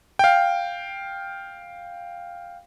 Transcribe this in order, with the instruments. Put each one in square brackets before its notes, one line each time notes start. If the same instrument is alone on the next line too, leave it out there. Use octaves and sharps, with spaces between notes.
[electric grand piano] F5 G5